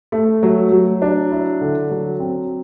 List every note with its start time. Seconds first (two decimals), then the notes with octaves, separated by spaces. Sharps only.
0.12 A3
0.43 F#3
0.72 F#3
1.02 D4
1.32 E4
1.61 D3
1.90 F#3
2.20 C4